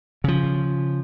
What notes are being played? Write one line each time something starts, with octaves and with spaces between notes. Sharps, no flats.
C#3 F3